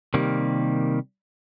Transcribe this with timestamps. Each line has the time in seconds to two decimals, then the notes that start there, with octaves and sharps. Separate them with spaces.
0.14 C3 D#3 G3 A#3